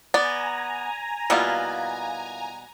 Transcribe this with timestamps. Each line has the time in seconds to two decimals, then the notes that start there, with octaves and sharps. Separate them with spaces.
0.14 B3 D5 G#5 A#5
1.30 B2 G3 A#3 B3 E4 F4